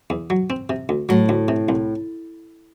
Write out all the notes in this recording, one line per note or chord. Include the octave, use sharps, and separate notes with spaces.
E2
F#3
C4
C3
D2
A2 F#3
D2
C3
C2